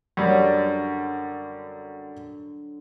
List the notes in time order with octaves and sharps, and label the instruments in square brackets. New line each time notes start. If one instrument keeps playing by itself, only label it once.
[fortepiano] F#2 G3 [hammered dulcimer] D3 F#3